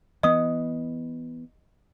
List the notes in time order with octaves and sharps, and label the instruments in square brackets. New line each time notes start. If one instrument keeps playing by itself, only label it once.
[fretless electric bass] E3 B3 [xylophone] D#5 D#6